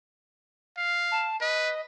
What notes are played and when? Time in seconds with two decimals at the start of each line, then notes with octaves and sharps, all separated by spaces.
0.77 F5
1.12 A5
1.41 B4 D#5